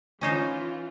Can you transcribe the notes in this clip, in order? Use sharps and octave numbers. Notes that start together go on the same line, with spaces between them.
E3 C#4 D#4 F4 C5